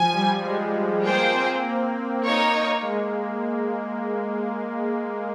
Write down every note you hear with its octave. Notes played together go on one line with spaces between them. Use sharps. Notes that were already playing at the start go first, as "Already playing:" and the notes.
Already playing: F3 G#5
G3
G#3
A#3 F4 G#4 C5 G5
C4
A#3
D#4 A#4 C#5
G#3